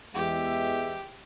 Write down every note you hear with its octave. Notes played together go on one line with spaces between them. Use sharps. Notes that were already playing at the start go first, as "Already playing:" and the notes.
E2 G#3 G4 E5